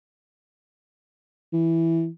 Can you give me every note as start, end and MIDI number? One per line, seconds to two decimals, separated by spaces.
1.53 2.08 52